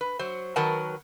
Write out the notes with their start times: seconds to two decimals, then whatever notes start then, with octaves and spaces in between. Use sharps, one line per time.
0.01 B4
0.19 F#3 C5
0.56 D#3 F#3 A#4 B4 F#5 A5